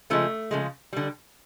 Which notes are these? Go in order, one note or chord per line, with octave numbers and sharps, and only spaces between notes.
C#3 F3 G#3 A3
C#3 F3 G#3
D3 G3